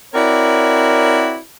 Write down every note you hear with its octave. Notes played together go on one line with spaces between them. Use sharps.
C4 E4 F#4 A#4 C#5 D5